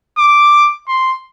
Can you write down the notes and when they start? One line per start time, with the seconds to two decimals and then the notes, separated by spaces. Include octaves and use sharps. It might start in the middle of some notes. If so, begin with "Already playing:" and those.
0.18 D6
0.88 C6